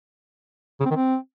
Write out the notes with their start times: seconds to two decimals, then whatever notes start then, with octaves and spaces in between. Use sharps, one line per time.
0.80 C#3
0.85 C4
0.91 D#3
0.96 C4